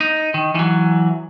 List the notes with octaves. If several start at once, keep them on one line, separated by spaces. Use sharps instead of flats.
D#4
D#3
E3 F#3